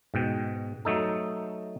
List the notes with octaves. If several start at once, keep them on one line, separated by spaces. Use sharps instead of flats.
G#2 B2 G5
F#3 A3 D#4 A4